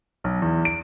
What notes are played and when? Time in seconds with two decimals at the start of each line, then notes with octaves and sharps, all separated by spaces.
0.24 B1
0.42 E2
0.65 D7